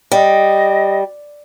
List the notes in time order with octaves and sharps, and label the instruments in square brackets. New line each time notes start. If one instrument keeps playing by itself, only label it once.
[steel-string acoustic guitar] G3 [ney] D#5